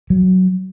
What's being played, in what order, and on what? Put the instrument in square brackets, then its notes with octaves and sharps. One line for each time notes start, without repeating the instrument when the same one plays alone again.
[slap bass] F#3